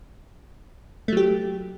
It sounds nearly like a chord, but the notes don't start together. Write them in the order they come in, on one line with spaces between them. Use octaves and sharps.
A3 F#3 G4